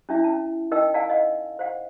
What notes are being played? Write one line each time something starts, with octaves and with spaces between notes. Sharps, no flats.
C#4 D4 E4 E5
C#4 A5
D#4 A#4 D#5 G5 E6
D5 F5 F#5 G#5 A5
D#5 F5 F#5
C5 F5 F#5